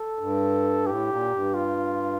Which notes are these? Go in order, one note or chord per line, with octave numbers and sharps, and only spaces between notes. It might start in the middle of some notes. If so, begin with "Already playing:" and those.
Already playing: A4
G2
A2 G4
A#2
G2
F4